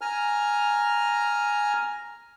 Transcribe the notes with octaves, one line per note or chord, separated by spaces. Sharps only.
G#5 A#5 F6